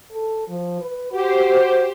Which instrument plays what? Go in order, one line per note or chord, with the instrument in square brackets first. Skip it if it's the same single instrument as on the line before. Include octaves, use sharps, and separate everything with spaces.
[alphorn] A4
F3
B4
[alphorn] F#4 [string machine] G4 C5